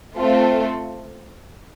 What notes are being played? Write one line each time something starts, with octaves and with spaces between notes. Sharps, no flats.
A3 C4 F4 A4